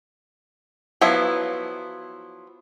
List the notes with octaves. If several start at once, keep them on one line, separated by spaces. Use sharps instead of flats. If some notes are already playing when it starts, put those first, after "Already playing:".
F3 F#3 B3 E4